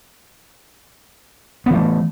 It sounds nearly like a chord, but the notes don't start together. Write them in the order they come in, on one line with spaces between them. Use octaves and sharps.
B3 E3 A3